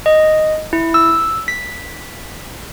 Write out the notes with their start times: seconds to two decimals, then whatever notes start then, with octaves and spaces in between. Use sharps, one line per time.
0.06 D#5
0.73 E4
0.94 E6
1.48 B6